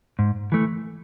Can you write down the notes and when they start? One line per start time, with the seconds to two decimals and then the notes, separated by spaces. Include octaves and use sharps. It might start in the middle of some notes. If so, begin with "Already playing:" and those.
0.19 G#2
0.52 E3 A3